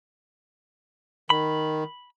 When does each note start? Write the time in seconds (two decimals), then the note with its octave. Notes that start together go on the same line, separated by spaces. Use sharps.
1.30 D#3 B5